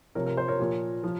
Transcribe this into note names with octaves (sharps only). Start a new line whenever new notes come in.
C3 F3 A#4 C#5
A#4
C5
A#4 C#5
A#2 F3
F3